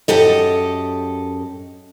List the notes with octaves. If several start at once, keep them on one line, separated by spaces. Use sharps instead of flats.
F#2 G4 A4 D#5